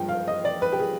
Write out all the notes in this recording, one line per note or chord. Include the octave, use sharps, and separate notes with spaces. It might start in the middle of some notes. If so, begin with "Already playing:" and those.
Already playing: G2 F3 G#3 G5
F5
D#5
D5
B4
G4
G#4